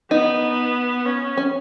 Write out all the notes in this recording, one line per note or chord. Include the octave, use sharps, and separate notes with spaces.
B3 D#4
C#4
C#4